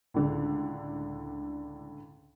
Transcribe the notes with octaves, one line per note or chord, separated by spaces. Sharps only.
C#2 A2 D3